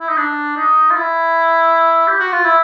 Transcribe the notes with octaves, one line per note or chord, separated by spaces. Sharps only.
E4
D#4
D4
D#4
F4
E4
G4
F#4
F4
E4